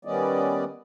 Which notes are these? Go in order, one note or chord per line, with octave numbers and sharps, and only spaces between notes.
D#3 G3 B3 C#4 D5 D#5